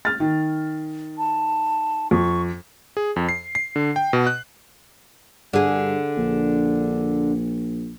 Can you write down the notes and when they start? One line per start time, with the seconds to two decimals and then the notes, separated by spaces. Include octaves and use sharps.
0.05 F6 A6
0.20 D#3
1.18 A5
2.11 F2 C#6
2.97 G#4
3.16 F2
3.29 C7
3.55 C7
3.76 D3
3.96 G5
4.13 B2
4.27 F#6
5.53 G2 D3 G#4
6.18 A#1